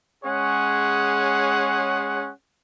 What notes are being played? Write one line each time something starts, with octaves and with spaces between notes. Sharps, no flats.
G#3 C#4 G#4 C#5 F#5